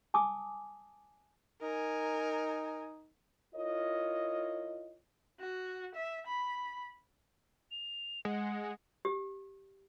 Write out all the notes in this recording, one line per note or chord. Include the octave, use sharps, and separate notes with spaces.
G#5 A5 D6 D#6
D#4 A#4 G#5
E4 F4 A#4 C#5 D#5
F#4
E5
B5
F7
G#3 F#5
G4